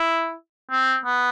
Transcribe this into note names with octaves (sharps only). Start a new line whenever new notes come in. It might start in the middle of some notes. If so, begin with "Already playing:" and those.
Already playing: E4
C4
B3